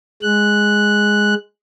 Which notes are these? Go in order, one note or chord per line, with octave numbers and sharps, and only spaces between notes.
G#3 F#6